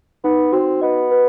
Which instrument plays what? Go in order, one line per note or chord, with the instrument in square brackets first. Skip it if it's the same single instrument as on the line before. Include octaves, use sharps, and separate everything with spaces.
[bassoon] B3 [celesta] D#4
[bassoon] C4 [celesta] F#4
[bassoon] B3 [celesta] D#5
[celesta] B4